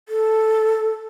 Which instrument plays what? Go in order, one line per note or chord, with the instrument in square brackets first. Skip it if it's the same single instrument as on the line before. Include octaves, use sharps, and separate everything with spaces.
[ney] A4